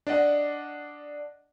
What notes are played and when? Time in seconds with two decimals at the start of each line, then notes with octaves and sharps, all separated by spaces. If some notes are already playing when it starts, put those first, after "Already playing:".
0.07 D4 D5 D#5 F#5